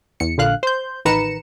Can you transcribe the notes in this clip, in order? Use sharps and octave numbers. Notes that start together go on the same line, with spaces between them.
E2 C#7
A#1 A#2 D3 F5 F#6
C5 G6
A1 D#3 B4 A#5 C#7 E7